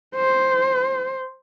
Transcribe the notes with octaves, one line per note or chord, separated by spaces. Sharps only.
C5